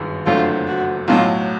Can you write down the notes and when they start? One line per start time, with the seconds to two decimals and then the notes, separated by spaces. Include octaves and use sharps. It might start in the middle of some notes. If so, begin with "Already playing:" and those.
Already playing: G1 F#2 D#3 G#3
0.26 F#1 F2 D3 F#3 A3 F4
0.67 F#4
1.07 B1 A2 F#3 F4